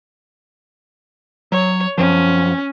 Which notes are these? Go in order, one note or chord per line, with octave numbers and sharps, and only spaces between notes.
F#3 C#5
F#2 F3 C#4